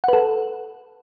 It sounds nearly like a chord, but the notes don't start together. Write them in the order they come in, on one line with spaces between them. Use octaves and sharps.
F#5 B4 A4